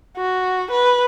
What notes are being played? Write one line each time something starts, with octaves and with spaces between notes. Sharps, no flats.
F#4
B4